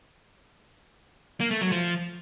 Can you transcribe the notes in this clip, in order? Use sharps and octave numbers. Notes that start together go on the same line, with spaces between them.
A#3
A3
F#3
F3